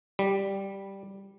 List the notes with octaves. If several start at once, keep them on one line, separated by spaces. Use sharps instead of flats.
G3